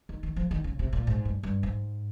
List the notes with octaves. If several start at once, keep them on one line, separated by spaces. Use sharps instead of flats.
D#3
D#3
F3
D#3
C#3
C3
A#2
G#2
G2
G2
G#2